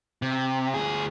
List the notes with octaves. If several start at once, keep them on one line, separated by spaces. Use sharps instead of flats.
C3
D2 G#4